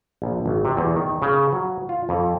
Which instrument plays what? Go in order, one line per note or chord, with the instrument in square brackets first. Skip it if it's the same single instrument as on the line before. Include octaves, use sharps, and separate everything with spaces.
[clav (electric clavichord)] A#1
G#1
C3
E2
D#3
C#3
F#3
F4
F2